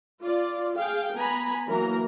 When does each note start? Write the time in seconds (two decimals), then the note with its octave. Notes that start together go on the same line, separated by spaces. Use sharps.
0.23 F4 D5
0.78 G#4 F5 G5
1.16 B3 G#5 A#5 B5
1.68 E3 F#3 A#3 A#4 A#5